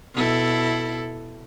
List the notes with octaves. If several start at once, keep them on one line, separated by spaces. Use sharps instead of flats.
B2 E4 A4